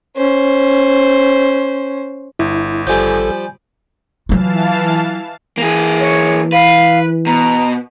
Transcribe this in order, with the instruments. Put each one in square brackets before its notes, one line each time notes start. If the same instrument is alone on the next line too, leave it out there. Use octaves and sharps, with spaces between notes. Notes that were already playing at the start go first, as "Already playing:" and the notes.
[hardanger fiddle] C#4 C5
[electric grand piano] G1 [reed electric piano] E4
[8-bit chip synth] G#1 A4 [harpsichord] F3 G3 G5 [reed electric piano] G#5 G6
[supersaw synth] E3 F5 A5 [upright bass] F#3 F4
[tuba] E3 [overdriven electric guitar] A#3 G#4
[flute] C#5
[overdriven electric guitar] B4 [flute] F5
[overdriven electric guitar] B2 [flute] A#5